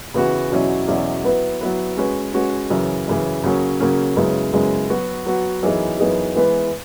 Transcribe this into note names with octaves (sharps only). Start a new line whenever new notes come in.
C#3 E3 B3 F#4 B4
E2 B2 F#3 C#4 E4
E2 B2 F#3 C#4 E4
F#3 B3 E4 B4
F#3 B3 E4 B4
G#3 C#4 F#4 B4
G#3 C#4 F#4 B4
F#2 C#3 E3
F#2 C#3 E3
C#3 F#3 A#3 C#4
C#3 F#3 A#3 C#4
F#2 C#3 G#3 B3 E4
F#2 C#3 G#3 B3 E4
F#3 B3 F#4
F#3 B3 F#4
F#2 E3 B3 D#4 G#4
F#2 E3 B3 D#4 G#4
E3 G#3 B3 E4 B4